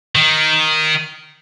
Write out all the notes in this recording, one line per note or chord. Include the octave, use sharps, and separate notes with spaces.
D#3